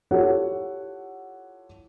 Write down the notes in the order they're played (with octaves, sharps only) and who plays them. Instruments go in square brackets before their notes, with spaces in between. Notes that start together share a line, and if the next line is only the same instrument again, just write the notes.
[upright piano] E4 F4 G4 A4 C#5 F#5